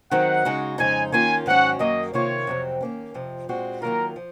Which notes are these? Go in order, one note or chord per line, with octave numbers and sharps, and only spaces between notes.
D#3 F#3 C4 D#4 F#5
C#3 G#3 D#4 F#4
F2 C#3 G#3 D#4 G#5
D#3 A#3 C#4 F4 G#5
G#2 D#3 F#3 C#4 F#4 F#5
F#2 D#3 F#3 A#3 D#5
C3 D#3 A#3 F4 C#5
F2 C3 F#3 C4
D#3 A#3 C#4
F2 C3 F3
A#2 G#3 C4 F#4
D#3 F#3 A#3 F4 A#4
F3